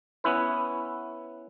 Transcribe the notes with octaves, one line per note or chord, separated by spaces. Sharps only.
B3 C#4 E4 B4